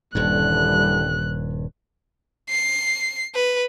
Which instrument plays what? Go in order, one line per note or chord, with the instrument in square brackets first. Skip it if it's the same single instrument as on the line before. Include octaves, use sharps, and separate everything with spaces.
[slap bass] D#1 G2 [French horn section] D3 E3 G3 [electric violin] F#6
[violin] C7
B4